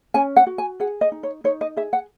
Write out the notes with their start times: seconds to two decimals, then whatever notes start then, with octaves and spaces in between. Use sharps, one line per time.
0.14 C#4 G#5
0.36 F#5
0.47 F#4
0.58 G#5
0.80 G#4 F#5
1.01 D#5
1.12 D#4
1.23 C#5
1.44 D#4 C#5
1.61 D#5
1.76 G#4 E5
1.93 F#5